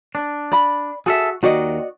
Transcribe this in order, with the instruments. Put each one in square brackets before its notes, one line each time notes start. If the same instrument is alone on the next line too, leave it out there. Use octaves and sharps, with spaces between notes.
[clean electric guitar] D4
[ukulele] D5 B5
[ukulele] F#4 [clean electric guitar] G#4 A4 E5
[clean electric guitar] D#2 D#3 [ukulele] F#4 D5 D#5